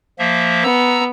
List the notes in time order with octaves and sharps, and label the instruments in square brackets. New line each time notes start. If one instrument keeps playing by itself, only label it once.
[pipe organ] F3 A#3 E5
[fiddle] B3 [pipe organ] A#5 E6